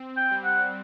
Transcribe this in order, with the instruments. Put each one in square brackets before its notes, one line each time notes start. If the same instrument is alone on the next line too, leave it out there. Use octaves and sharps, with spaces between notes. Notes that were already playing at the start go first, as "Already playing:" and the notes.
Already playing: [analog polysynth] C4
[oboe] G5
[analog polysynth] G3
[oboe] F#5